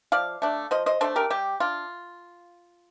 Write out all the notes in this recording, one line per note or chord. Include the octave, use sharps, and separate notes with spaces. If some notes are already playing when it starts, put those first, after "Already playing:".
F3 D5 F5
A3 D4
F3 C5 D#5
C5 D#5
A3 D4 A4 C5
G4 A#4
G3 G4
D4 F4